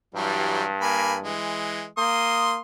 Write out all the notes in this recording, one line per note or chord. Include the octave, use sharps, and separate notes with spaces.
G2 E3 F#3 G3
A#3 G#5 B5
E3 G#3
A#3 C6 D#6